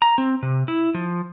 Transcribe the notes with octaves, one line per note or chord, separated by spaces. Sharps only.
A#5
C4
C3
E4
F3